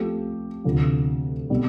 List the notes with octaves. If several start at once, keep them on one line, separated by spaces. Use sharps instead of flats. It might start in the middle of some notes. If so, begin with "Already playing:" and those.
Already playing: F3 A3 C4 G4
D2 C3 F3
B2 G3 C4